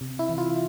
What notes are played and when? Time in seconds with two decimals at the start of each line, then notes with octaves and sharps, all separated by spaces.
0.01 C3
0.19 E4
0.29 E3
0.38 F4